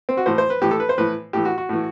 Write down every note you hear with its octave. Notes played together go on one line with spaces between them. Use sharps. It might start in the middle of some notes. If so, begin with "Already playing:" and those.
C4
F#4
A2 E3 C5
C5
B4
A2 E3 G4
A4
B4
C5
A2 E3 B4
A2 E3 G4
F#4
F#4
A2 E3